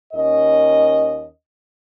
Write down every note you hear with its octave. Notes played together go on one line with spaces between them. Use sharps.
D#2 C#4 A#4 D#5